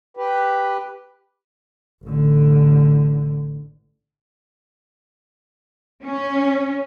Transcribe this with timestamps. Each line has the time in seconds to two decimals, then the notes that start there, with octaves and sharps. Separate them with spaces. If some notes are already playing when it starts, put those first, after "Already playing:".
0.17 G4 B4
2.04 A1 D3
6.04 C#4